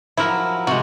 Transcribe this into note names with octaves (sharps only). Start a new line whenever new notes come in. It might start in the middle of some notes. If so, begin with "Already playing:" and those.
F3 F#3 E4 A#4
C3 G#3 F#4